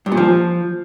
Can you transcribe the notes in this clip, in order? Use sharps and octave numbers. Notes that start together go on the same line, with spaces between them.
G2
A#2
F3